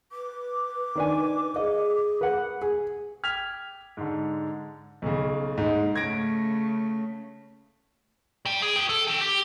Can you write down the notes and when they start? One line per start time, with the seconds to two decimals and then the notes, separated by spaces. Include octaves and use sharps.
0.12 B4 D6
0.95 D#3 D4 G#5
1.56 G#4 D#5
2.21 B4 F#5
2.62 G#4
3.23 G5 F6 G#6 B6 F7
3.97 G#2 D3
5.02 B1 C#3
5.58 G#2 A#3
5.96 C#3 A3 G#6 A#6 D7
8.46 G3 G5
8.62 G#4
8.76 F#4 G5
8.89 A4
9.08 C#4 G5
9.21 G4